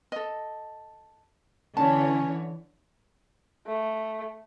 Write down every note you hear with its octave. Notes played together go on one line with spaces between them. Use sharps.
A4 D#5
D3 E3 C#4 C#5 A5
A3